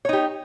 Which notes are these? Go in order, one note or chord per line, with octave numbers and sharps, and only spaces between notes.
D#4 G4 C#5